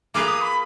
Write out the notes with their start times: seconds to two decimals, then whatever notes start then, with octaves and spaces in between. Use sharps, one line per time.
0.14 A#3 F4 G#4 B4 D6
0.28 D#6
0.41 B5